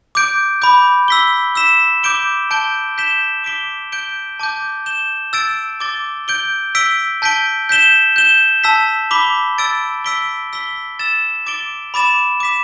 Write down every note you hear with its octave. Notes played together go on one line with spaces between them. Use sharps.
D6 G6 D7
B5 D6 G6
E6 B6 G7
E6 B6 E7
D6 G6 D7 G7
A5 G6 D7 G7
G6 B6 E7 G7
D6 B6 D7 G7
G6 D7 G7
A5 D6 G6
G6 E7 G7
E6 A6 D7
D6 A6 G7
G6 D7 G7
E6 B6 D7 G7
A5 G6 B6 D7 G7
G6 B6 E7 G7
G6 E7 G7
A5 E6 B6
B5 D6 B6 G7
E6 A6 D7
E6 B6 D7 G7
E6 B6 G7
E6 A6 E7
D6 A6 D7 G7
B5 D6 A6 E7
D6 B6 E7